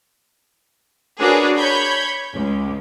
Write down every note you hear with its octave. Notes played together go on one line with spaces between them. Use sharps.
D4 F#4 G#4 A#4 B4 C#5
C#5 B5 G6 G#6
C#2